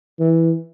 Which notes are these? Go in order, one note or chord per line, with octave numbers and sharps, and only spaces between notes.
E3